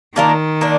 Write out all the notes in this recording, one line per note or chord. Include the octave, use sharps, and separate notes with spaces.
D#3 A#3 D4 F4 A#4
A#3 D4